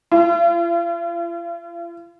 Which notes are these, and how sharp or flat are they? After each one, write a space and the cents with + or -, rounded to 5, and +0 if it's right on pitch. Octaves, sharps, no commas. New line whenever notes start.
F4 -45